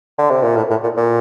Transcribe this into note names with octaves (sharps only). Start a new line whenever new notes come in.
D3
C3
A#2
A2
A2
A#2
A#2